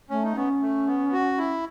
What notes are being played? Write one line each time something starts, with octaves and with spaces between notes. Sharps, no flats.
A3 C#4
D#4
B3 C#4
A3
B3
F#4
E4